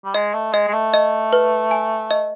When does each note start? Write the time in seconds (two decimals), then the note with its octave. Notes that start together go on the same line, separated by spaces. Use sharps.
0.05 G3
0.14 G#3 D#5
0.34 A3
0.53 G#3 D#5
0.68 G#3
0.73 A3
0.94 D#5
1.33 B4
1.71 G#5
2.11 D#5